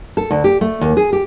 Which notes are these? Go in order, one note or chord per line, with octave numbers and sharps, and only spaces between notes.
A4
D2
G4
A3
D#2
G#4
G4